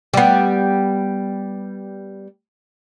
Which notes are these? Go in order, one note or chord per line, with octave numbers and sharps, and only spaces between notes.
G3 B3